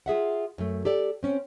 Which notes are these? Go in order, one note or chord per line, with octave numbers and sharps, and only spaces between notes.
F4 G#4 E5 F#5
F#2 A3
G4 A4 D5
C4 C#4